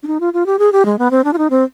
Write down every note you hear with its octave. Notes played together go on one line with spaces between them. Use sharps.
D4
D#4
F4
F4
G4
G#4
G4
G#3
B3
C4
D4
F4
D#4
C4